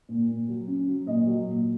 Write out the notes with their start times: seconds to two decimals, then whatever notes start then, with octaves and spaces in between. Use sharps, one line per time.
0.09 A#2
0.28 A#2
0.49 F#3
0.68 C#4
0.87 F#3
1.06 A#2 D#5
1.27 F#3
1.47 A#2